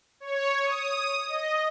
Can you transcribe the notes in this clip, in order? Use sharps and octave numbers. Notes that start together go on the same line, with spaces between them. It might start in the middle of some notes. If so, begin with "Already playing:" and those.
C#5
D#6
D#5